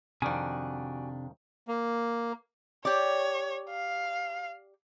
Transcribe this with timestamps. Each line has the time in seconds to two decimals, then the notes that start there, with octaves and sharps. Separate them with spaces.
0.22 F2 C3 D#3 D4 F#4 D5 G#5
1.68 A#3
2.85 G4 C#5 D5
3.70 F5